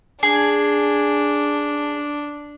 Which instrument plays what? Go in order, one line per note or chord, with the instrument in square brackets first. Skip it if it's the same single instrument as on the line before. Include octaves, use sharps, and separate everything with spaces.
[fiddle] D4 [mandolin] G#4